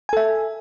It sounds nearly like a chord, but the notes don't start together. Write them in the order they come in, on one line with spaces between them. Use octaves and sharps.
G#5 A4 E5